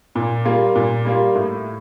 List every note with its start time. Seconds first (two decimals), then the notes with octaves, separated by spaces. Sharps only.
0.15 A#2
0.45 G3 A#3 F4
0.75 A#2
1.05 G3 A#3 F4
1.35 A2